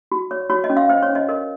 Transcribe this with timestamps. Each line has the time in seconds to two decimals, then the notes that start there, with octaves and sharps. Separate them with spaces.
0.12 F#4
0.31 C#5
0.50 F#4 C#5
0.64 D#5
0.70 C#4
0.77 F5
0.89 C5 D#5
1.02 C#5
1.09 C#4
1.15 D#5
1.29 A#4 D#5